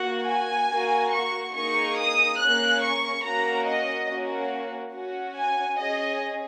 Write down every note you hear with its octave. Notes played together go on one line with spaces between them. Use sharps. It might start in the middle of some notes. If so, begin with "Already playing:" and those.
Already playing: A#3 F#4 F#5
G#5
A#3 F#4
C#6
A#3 D#4 G#4 C#6
D#6
A#3 C#4 G#4 F#6
C#6
A#3 C#4 F#4 A#5
D#5
A#3 C#4 F#4
C#4 F#4
G#5
C#4 G#4 D#5